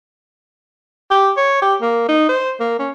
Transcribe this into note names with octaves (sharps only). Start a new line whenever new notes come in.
G4
C#5
G4
A#3
D#4
C5
A#3
C#4